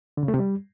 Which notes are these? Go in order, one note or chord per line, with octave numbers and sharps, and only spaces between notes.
D3
C#3
A3
C3
G3